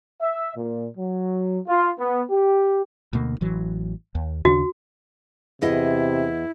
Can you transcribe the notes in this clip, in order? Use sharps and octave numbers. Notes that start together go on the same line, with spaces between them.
E5
A#2
F#3
F4
B3
G4
D2 B2 A#3
A1 E3 F#3
D#2
D#2 C#3 D4 F#4
E2 C3 E4 D#5